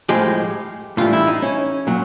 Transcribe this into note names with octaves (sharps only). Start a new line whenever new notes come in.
A2 F3 G#3 G4
A2 E3 G3 F4
E4
D#4
C#4
A#2 F#3